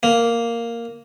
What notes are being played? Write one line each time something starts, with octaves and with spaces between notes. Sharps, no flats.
A#3